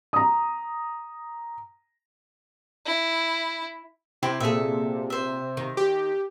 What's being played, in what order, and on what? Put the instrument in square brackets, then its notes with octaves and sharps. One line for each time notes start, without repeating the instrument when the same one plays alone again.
[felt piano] A#5 D#6
[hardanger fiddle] E4
[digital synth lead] C3 [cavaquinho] E4 G4 C5
[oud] A#2 G#4 [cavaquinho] A4 E5
[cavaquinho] C5 E5
[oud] D#3
[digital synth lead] G4